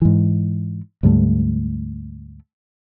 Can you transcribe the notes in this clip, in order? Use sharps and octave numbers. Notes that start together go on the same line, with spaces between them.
G#2 E3
D2 G#2 G3 A3